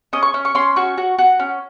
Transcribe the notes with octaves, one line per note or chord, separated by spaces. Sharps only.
C#4 D#5
C#6
C#4
C#6
C#4 C6
F#4 C#6
F#4
F#4
C#4